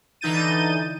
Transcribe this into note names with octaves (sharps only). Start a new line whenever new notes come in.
D3 E3 D#4 G6 A6 D#7